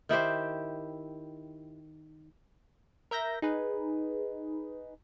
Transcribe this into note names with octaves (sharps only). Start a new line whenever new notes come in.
D#3 E4 G4 C5
A#4 E5 G6 A#6
D#4 G#4 B4